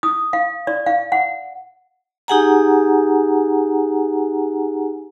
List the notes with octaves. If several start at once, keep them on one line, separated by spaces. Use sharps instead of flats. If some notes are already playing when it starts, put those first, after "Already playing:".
D#6
F5
D5
F5
F#5
D#4 G4 G#4 F#5 G#5 A#5